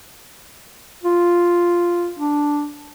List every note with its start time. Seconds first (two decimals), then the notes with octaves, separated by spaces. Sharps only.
1.04 F4
2.19 D4